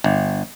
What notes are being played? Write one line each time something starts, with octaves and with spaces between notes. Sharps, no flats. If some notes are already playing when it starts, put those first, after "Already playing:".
G1